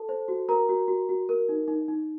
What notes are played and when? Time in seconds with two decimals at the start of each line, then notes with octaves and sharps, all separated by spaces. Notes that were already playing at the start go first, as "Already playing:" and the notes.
Already playing: A4 A5
0.09 C5
0.28 F#4
0.49 F#4 A#4 A#5
0.69 F#4
0.88 F#4
1.09 F#4
1.29 A#4
1.49 D#4
1.68 D#4
1.88 D#4